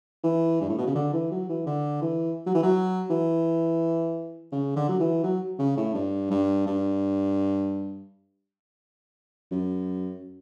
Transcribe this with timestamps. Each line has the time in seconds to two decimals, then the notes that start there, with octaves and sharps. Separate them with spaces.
0.24 E3
0.61 G2
0.69 A2
0.78 B2
0.87 C#3
0.95 D3
1.13 E3
1.31 F#3
1.49 E3
1.66 D3
2.02 E3
2.46 F#3
2.55 E3
2.63 F#3
3.10 E3
4.52 C#3
4.76 D3
4.89 F#3
5.00 E3
5.23 F#3
5.59 C#3
5.77 A2
5.94 G2
6.31 G2
6.67 G2
9.51 F#2